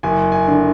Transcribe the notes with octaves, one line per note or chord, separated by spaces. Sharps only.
F#1 G#5
G#5
D3